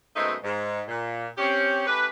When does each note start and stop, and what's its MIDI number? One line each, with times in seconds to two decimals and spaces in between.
0.16 0.35 42
0.16 0.35 47
0.16 0.35 56
0.16 0.35 57
0.16 0.35 60
0.16 0.35 63
0.43 0.82 44
0.88 1.27 46
1.38 1.85 60
1.38 1.85 61
1.38 1.85 67
1.87 2.08 57
1.87 2.08 61
1.87 2.08 67
1.87 2.08 71